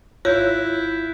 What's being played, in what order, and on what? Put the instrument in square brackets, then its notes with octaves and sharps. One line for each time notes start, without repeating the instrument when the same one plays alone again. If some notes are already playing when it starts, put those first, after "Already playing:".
[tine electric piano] G#1 F4 [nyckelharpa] E4 [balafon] C#5 [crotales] F#6 G6